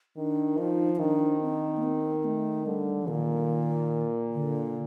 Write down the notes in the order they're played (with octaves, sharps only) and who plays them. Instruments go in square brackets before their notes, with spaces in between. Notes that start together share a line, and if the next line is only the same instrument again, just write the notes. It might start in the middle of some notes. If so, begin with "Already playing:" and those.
[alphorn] D#3 [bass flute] D4
[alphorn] F3 [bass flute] D#4
[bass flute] D#4
[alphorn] D#3 [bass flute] D4
[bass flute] C4
A#3
C4
A3
[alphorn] D3 [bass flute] G3
[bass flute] F3
[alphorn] A#2 [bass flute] D#3
[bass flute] D3